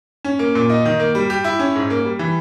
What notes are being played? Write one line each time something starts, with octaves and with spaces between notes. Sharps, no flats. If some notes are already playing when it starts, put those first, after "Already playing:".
C#4
A#3
A#2
D#4
D#3
A#3
G3
G4
E4
C#4
G#2
A#3
G3
E3